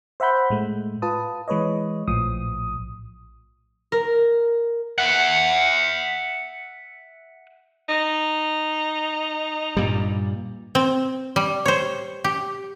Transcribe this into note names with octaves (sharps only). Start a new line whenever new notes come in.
C5 E5 F#5 B5 G6
A2 G#3 A3
F4 B4 A5 D#6
E3 G#3 B4 C#5 D#5
A#1 A2 F3 D#6
A#4
E5 F#5
D#4
G2 A#2 G3
C4
G3
C5 C#5
G4